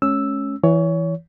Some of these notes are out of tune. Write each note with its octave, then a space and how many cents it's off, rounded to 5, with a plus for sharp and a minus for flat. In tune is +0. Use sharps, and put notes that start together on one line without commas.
G#3 +45 C#4 +0 E6 +0
E3 +5 C#5 +25